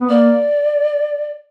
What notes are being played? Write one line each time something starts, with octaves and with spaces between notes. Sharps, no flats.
B3
A#3 D5